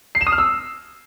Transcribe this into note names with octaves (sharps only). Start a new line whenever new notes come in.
C7
E7
D#6
F6
E6